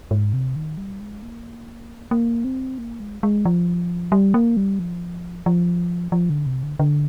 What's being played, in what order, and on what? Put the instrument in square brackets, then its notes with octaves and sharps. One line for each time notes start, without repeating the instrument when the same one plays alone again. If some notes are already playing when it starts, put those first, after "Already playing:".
[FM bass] G#2
C3
D#3
G3
G#3
A#3
A#3
C4
A#3
G#3
G#3
F3
G3
A#3
G3
F3
F3
F3
D3
C3
D3
D3